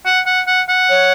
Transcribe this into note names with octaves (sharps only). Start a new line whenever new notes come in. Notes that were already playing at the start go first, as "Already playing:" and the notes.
F#5
F#5
F#5
F#5
C#5